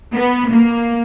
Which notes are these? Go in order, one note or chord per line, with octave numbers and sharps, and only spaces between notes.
B3
A#3